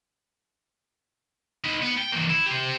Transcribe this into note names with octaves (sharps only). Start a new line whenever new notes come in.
D#4 B4
B3
G5
E3 A#3
E4
G4 C5